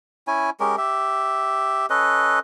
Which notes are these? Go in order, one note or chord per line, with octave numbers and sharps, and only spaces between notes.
C#4 E4 G#5
G#3 C#4 G4 A#4
G4 E5
C#4 A4 B4 D#5